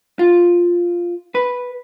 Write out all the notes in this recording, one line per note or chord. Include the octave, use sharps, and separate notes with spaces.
F4
B4